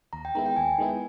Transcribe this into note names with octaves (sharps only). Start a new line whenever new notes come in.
D#2 A#5
G5
D#3 G#3 B3 E4 A#5
G5
D#2 G#5
D#3 G#3 B3 E4